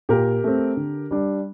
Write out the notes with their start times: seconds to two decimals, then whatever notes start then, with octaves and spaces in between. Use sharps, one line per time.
0.09 A#2 G4 A#4
0.44 A3 C4
0.77 D3
1.11 G3 D4